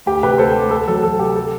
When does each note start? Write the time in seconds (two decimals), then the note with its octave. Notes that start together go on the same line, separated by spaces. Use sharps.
0.06 D2 G4
0.23 C3 G4 B4
0.38 D2 A4 C5
0.55 D2
0.71 D2 A4
0.88 F#3 A4
1.03 F#3 A4
1.19 C3 G4
1.36 A4